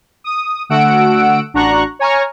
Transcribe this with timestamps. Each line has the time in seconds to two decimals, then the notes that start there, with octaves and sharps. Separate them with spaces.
0.24 D#6
0.69 D3 A3 F#4 F#5 E6 D7
1.53 A1 D4 F#4 A#5 C#6 F#6
1.99 C#5 G#5 A#5 C#6 F6